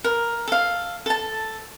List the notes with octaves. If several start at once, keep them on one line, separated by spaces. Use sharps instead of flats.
A#4
A4 F5
A4 A5